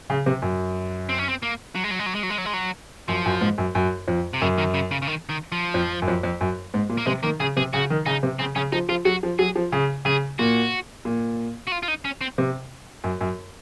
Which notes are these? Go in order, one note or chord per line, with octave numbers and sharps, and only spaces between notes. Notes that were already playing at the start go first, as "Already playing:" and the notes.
C#3
C3
F#2
C4
C#4
C4
A#3
F#3
G#3
F#3
G#3
F#3
G#3
F#3
G#3
F#3
G#3
F#3
F#2 F3
F#2
G#2
F#2
F#2
F2
C3
F#2 C#3
D#3
C#3
C#3
C#3
D#3
D#3
F3
F2
F#2
F2
F2
F#2
G#2
A#2
A#3
C3 G#3
D#3 A#3
C#3 G#4
C3 G#4
C#3 F#4
D#3
C#3 D#4
C3
C#3 C4
C#3 C#4
F3 D#4
F3 F4
F#3 F#4
F3
F#3 G#4
F3
C#3
C#3 G#4
A#2 F#4
A#2
F#4
F4
F4
D#4
C#4
C4
C3
F#2
F#2